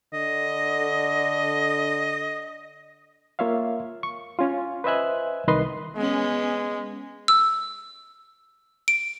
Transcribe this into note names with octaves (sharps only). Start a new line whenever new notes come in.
D3 D#5
A#3 F4 C#5 E5 F5
C#6
C#4 F4
B4 C5 D#5 E5 G#5 F#6
C2 D#3 B4 D#5 C6
G#3 B3 C#4
E6
D7